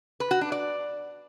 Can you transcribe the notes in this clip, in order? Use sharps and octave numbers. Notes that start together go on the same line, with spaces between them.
B4
F#4
D4
D5